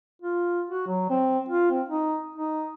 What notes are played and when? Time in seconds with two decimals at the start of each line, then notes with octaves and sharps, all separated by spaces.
0.22 F4
0.70 F#4
0.87 F#3
1.10 C4
1.49 F4
1.70 C4
1.88 D#4
2.35 D#4